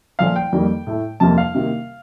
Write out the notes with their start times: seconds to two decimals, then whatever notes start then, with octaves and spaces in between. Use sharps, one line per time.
0.19 A#2 F3 A3 F5
0.36 G5
0.52 F2 D#3 G3 A#3
0.87 A2 A3
1.20 F2 C3 F3 A#3 A5
1.38 F5
1.55 C3 D#3 A#3